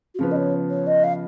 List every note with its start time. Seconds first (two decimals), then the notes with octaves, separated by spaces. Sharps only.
0.14 F#4
0.19 C#3 F3 B3 G#4
0.31 D#5
0.36 C#5
0.70 C#5
0.87 D#5
1.04 F5